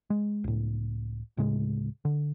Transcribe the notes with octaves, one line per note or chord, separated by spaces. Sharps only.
G#3
C#2 A2
D1 A2 C#3 G#3
D3